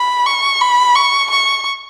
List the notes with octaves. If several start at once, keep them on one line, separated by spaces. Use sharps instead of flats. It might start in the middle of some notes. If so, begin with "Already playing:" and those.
Already playing: B5
C#6
B5
C#6
C#6